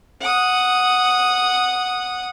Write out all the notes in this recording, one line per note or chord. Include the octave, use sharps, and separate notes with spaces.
F#5 D#6